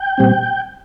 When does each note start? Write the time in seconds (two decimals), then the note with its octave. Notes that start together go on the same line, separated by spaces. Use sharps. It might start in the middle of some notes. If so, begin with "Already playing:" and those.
Already playing: G5
0.18 A#2 G3 C4